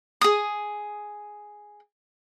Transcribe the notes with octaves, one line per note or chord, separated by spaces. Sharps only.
G#4 D#6